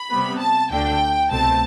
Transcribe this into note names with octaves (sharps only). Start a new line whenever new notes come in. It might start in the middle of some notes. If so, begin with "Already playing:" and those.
Already playing: B5
C3 G3 B3
A5
D2 D3 A3 D4 G5
C2 B2 A3 C4 A5